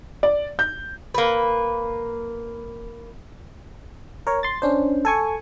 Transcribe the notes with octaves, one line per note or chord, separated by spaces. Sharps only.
D5
G6
A#3 B4
A#4 C#5
C6 A6
C#4 D4 C5
A4 G#5 C#6